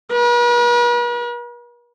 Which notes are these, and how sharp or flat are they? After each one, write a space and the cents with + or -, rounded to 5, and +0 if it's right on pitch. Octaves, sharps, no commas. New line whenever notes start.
B4 -45